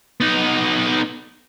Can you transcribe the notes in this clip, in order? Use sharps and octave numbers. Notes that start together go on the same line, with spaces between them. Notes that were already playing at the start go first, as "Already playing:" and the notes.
B3 D#4